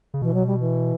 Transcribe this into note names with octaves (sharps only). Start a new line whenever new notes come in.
C#3
B2 E3
F#3
G3
E3